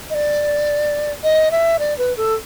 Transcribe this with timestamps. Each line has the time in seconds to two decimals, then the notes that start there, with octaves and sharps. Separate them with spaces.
0.10 D#5
0.14 D5
1.24 D#5
1.51 E5
1.79 D5
1.98 B4
2.17 A4